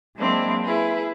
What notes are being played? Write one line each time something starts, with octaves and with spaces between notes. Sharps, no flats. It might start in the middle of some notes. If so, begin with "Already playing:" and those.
F#3 G#3 A#3 C4 D4 E4
E4 G#4 B4